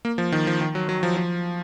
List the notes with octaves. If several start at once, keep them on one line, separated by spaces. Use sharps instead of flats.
A#3
F3
D#3
F3
D#3
F#3
F#3
F3
F3